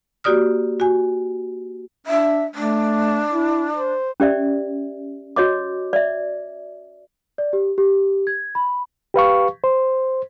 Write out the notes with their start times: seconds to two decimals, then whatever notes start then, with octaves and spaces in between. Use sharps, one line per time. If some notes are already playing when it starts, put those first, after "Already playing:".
0.24 A#3 F#4 G4 D5 D#6 F6
0.80 F#4 G#5
2.07 D4 E5
2.55 A3 D4
3.31 E4
3.75 C5
4.20 C#4 G4 D5 E5
5.36 F#4 C#5 D#5 D6
5.93 D5 E5
7.38 D5
7.53 G4
7.78 G4
8.27 G#6
8.55 B5
9.14 G4 B4 F5 C#6
9.64 C5